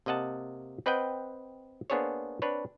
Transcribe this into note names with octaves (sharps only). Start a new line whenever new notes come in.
C3 A#3 D#5 F#5 A5
C4 B4 D#5 F#5 G5
A#3 B3 D4 G#4 C5 C#5
C4 D4 B4 C#5